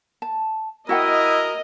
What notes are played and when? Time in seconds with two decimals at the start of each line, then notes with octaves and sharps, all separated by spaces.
0.22 A5
0.89 E4 F#4 A#4 D#5 F#5 G5